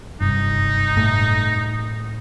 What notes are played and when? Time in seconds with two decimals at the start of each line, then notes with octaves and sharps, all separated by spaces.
0.20 F#1 G2 C3 D#4
0.97 A2